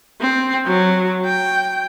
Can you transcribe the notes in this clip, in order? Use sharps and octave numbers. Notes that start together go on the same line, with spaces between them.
C4
F#3
G5